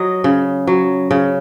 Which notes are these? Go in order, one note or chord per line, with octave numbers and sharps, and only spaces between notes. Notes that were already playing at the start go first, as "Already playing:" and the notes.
Already playing: F#3 D#5
C#3
F#3
C#3